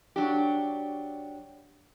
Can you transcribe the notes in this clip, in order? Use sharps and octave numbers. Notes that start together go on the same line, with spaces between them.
F#3 D4 G4